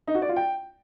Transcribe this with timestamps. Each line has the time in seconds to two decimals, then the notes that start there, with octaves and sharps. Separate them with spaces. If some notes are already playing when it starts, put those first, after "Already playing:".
0.08 D#4
0.15 F#4
0.22 D5
0.29 F4
0.36 G5